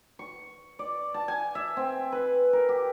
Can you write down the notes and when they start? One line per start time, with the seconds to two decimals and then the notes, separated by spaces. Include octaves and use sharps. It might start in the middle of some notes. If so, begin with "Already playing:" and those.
0.19 C#6
0.79 D5
1.14 A5
1.28 G#5
1.55 E5
1.77 C4
2.12 B4
2.53 A#4
2.69 G4